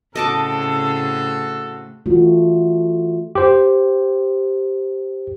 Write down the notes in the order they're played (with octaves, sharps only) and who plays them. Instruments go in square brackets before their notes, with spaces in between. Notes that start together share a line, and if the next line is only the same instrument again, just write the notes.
[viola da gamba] A2 C#3 C4 [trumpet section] F#4 A4 [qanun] D#5 A5 D6
[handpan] E3 A3 F4 F#4
[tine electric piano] G4 C5